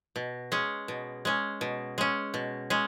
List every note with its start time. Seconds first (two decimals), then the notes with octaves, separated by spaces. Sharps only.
0.16 B2
0.52 G#3 C#4
0.88 B2
1.25 G#3 C#4
1.61 B2
1.98 G#3 C#4
2.34 B2
2.70 G#3 C#4